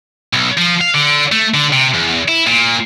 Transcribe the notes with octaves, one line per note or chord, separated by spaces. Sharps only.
B1
F3
F5
D3
A3
D3
C3
E2
E4
A#2